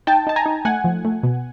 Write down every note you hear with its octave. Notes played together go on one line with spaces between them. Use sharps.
D#4 G5 A5
D#4 A5
G#5 A#5
D#4
A3 F#5 G#5
F3
A3
B2